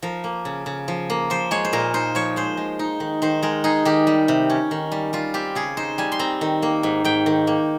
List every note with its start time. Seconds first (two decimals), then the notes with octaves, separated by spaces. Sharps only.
0.02 F3 A#4
0.24 A#3
0.45 C#3
0.66 C#3
0.88 F3
1.10 A#3
1.30 F3 C5
1.51 G#3 C#5
1.65 C5
1.73 A#2 A#4
1.94 D#4 C5
2.15 F3 C#5
2.36 G#3 C5
2.57 G#3
2.79 D#4
3.00 D#3
3.22 D#3 C5
3.43 G#3 A#4
3.64 D#4 G#4
3.85 D#3 G4
4.07 G3
4.28 C3
4.50 C#4
4.71 D#3
4.92 G3
5.13 G3 F4
5.34 C4 G4
5.55 C#3 G#4
5.77 D#4 C5
5.98 G3 G#5
6.12 C6
6.19 C4 A#5
6.41 D#3
6.62 A#3
6.83 G#2
7.04 G#2 G5
7.26 D#3
7.47 A#3